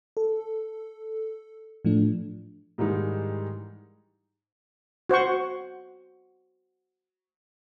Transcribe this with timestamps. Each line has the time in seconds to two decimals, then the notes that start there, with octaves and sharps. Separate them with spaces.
0.17 A4
1.85 A2 F3 A3 D4
2.78 G#2 D#3 E3 G3 G#3 D#4
5.10 F#4 C5 F#5 C#6